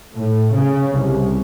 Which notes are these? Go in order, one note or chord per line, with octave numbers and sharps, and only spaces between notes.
A2
C#3
C2